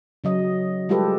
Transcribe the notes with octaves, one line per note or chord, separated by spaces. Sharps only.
C#3 F#3 D#5
G3 G#3 F4 G4 A4 B4